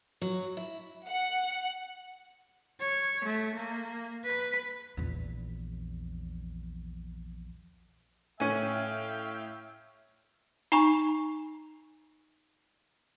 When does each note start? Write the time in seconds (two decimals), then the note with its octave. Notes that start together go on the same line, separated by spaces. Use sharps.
0.22 F#3
0.57 E4
1.07 F#5
2.80 C#5
3.25 A3
3.55 A#3
4.24 B4
4.97 A#1 E2
8.40 A2 C#4 E5 F5 G5 G#5
10.72 D#4 G#5 A#5 C#6